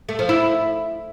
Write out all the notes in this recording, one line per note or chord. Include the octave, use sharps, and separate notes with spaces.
A3
F3
E4